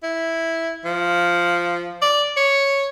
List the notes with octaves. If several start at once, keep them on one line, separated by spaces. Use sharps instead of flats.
E4
F3
D5
C#5